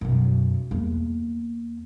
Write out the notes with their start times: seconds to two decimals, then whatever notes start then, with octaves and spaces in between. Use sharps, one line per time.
0.01 B1 F#2
0.71 E2 A#3